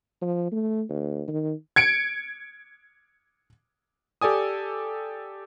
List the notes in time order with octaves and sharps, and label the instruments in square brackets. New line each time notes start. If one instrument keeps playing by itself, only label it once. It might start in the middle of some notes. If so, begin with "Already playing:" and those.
[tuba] F3
A3
D2
D#3
[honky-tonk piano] G#6 C#7 D7
[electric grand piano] G4 A4 D5 G#5 D#6